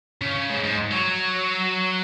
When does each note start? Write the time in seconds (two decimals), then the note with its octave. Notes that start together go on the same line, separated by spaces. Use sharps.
0.21 C#3
0.50 G#2
0.64 G#2
0.92 F#3